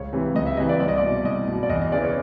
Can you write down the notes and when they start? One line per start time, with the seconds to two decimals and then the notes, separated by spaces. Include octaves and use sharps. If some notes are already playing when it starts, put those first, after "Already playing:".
Already playing: C#2 C#5
0.13 C3 E3
0.35 C#2 D#5
0.46 E5
0.57 C3 E3 D#5
0.69 D5
0.80 C2 D5
0.88 D#5
0.98 B2 D5
1.24 C2 D#5
1.47 B2
1.63 D5
1.70 E2 D#5
1.82 D#5
1.92 C#3 E3 D5
2.03 C#5